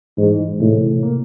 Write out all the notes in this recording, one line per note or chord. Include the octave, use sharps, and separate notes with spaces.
G#2 E3
A2 C3
A#3